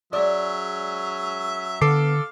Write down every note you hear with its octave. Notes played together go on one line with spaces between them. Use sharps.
F#3 G#3 C#4 D5 E5
D3 B3 A4 F5 D6 C7